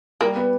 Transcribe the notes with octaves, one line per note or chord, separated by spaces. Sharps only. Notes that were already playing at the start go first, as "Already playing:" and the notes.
G3 A#3
B3